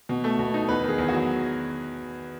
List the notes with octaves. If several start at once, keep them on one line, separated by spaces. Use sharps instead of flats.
B2
A3
B2
D#4
E2 B4
D#3
G#4
E2
F#4
F#3